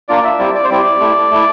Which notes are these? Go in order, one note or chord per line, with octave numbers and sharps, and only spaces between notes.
A#3 D4 F4 D5
E5
G3 C4 E4 D5
D5
C5
G3 C4 E4 D5
A3 E4
A3 E4